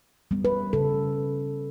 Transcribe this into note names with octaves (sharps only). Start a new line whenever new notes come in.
G3 B3
B4
C#3 A4